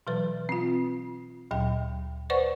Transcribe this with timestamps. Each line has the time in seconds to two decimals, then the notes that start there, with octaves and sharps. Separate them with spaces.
0.07 B2 E3 F#3 B4
0.49 C4 F4
1.51 D2 A#2 F#3 G5
2.30 B4 C5 D5 F#5 C#6